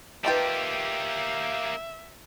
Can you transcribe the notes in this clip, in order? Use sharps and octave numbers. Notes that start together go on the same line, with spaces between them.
D#3 A#3 F4 G4 B4 E5 G5 A5